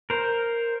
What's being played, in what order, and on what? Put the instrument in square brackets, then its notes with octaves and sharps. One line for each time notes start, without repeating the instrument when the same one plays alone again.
[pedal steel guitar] A#4 C5